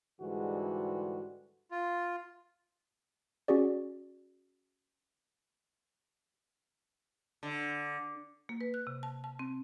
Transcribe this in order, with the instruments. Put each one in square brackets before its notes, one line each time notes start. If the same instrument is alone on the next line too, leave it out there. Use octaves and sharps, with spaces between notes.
[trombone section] G#2 D3 E3 G3 G#3 F#4
[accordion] F4
[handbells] C#4 F#4 G#4 D5
[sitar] D3
[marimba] A#3
B4
F#6
C3
A5
A5
C4